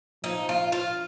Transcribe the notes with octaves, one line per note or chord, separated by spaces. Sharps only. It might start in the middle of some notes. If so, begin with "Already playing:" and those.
F3 D#4
F4
F4